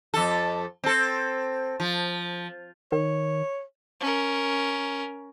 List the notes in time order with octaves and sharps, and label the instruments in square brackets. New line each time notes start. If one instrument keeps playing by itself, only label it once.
[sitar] F2 A4
C4 A4
F3
[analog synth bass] D#3 [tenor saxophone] C#5
[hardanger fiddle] C#4 A#4